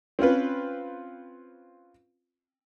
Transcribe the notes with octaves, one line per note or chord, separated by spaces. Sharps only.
C4 C#4 F4 B4